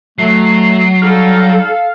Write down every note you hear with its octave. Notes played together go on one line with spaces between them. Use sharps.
F#3 A3 C7
G3 D#4 A4 F5